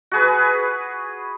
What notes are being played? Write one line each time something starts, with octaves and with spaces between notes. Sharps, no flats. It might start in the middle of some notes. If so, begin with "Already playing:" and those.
F#4 G#4 B4